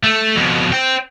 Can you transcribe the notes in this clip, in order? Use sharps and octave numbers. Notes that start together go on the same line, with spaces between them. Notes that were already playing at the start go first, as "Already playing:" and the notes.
A3
F2 B2
C5 G5